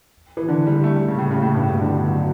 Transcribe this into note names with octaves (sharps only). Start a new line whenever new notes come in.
E3
D3
G3
A3
G3
C#3
A2
C#3
A2
G2
A2
B2
D3
F#3